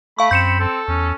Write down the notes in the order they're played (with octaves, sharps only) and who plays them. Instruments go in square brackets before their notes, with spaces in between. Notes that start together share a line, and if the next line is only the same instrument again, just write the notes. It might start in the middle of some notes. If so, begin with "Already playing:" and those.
[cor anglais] A3 [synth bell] F5 C#6 [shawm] B5
[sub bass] F#2 [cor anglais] C4 [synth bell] G6 C#7 E7
[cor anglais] C4 [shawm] A4
[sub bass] E2 [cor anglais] C#4